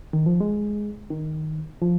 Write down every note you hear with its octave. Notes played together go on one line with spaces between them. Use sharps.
D#3
F3
G#3
D#3
F3